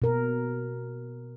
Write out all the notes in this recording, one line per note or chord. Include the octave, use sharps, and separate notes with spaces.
B2 A#4